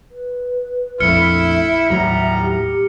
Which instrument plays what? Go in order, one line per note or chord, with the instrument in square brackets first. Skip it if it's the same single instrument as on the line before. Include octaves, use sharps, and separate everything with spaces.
[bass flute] B4
[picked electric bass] A#1 F2 A3 [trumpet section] E4 [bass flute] E5 [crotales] F6 C#7
[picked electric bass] D#2 A2 F#3 [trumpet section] G3 B3 A#5
[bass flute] G4